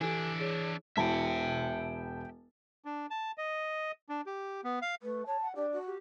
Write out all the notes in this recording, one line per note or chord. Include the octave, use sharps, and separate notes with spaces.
E3 D4 E4 G4 A4 G#5
G#4 C#5
E1 E4 E5 G5 A5
D4
A5
D#5
D4
G4
B3
F5
A3 B4
C#5 A5
F#5
D4 G4
F#4
G4